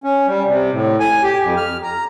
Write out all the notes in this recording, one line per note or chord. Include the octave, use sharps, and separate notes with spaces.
C#4
G3
C3
A2
G#5
G4
F2
F6
A#5